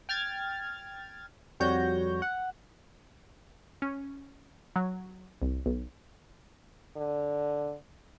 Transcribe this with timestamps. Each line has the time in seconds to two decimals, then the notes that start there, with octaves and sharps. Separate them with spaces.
0.09 G5 F6 G#6 A6
1.60 F2 G3 F#4 C#5 G6 A#6
2.22 F#5
3.82 C#4
4.76 F#3
5.42 C2
5.66 B1
6.96 D3